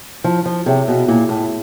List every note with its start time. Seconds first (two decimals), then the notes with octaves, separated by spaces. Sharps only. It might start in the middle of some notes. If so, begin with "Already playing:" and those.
0.24 F3 E4
0.46 F3
0.66 C3 G#4 C#5 E5 G5
0.88 B2
1.08 A#2 E4
1.29 A2